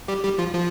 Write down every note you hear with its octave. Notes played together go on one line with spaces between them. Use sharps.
G3 G4
G3 G4
F3 F4
F3 F4